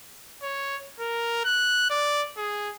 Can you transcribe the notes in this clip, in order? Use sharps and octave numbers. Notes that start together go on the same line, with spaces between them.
C#5
A#4
F#6
D5
G#4